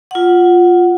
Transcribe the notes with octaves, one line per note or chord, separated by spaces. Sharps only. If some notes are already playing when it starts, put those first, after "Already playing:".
F4 F#5